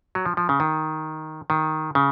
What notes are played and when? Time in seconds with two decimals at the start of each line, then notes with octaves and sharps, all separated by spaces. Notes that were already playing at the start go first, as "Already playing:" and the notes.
0.15 F#3
0.26 F3
0.37 F3
0.49 C#3
0.60 D#3
1.50 D#3
1.95 C#3